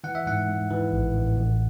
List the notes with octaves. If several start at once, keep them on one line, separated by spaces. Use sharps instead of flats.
E3 F#5
E5
G#2 F#5
G#2
E3
A1
A1
A1